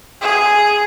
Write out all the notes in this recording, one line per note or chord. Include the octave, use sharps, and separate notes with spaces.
G#4